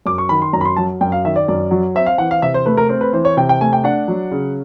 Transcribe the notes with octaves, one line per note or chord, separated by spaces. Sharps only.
F#2 D6
C#6
D#3 B5
C6
F#2 A#5
B5
C6
F#3 A5
F#2 G5
F5
D#3 E5
D5
F#2 D5
F#3
C4 E5
F5
E3 F#5
F5
C3 E5
C5
A3 B4
A#4
C4
B4
E3 C5
C#5
C3 G5
G5
A3 G#5
G5
D4 F#5
F#3
C#3